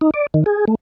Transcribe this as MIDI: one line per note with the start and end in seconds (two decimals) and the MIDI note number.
0.01 0.11 63
0.14 0.27 74
0.34 0.44 51
0.46 0.65 68
0.68 0.75 57